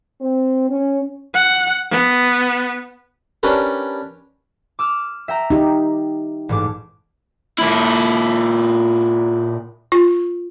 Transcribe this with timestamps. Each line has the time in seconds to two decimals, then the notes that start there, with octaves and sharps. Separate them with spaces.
0.21 C4
0.69 C#4
1.35 F#5
1.91 B3
3.43 C#4 D4 G4 A#4 B4
4.79 D6 E6 F6
5.28 E5 G5 A#5
5.50 D#4 G4
6.49 A1 G#2 D6
7.59 A#2 E4
9.92 F4